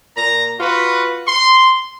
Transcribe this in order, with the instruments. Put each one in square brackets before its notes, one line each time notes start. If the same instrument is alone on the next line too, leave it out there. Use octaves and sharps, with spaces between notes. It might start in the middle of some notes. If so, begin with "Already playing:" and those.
[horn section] A#2 A#5
F4 F#4 B4
C6